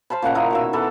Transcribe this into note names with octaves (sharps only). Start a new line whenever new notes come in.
C5 F5 A5 B5
A#2 C#3 F#5 A#5
E4 A#4 D#5
B2 D#3 E5
E3 B3 A4